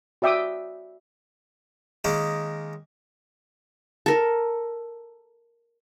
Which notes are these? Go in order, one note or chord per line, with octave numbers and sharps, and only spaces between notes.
F#4 D5 E5 G5 D6 D#6
D#3 G#3 A#3 C#4
A4 A#4